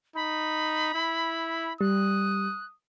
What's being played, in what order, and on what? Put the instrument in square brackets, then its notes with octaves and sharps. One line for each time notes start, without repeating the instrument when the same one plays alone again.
[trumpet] D#4 [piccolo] B5
[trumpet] E4
[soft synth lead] G3 [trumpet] D#6 [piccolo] F#6